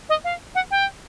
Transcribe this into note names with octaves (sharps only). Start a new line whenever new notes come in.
D#5
F5
F#5
G5